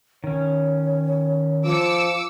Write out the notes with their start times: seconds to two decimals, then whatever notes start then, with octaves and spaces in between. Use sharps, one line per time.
0.24 D#3 C#4 C#5
1.65 F3 D6 E6 C#7